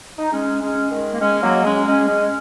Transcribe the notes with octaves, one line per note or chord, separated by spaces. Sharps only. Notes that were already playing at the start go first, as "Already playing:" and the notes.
D#4
G#3 C#4
G#3 C#4
D#3 G#3
A#3
G#3 C#4
F#3 A#3
G#3 C#4
G#3 C#4
G#3 C#4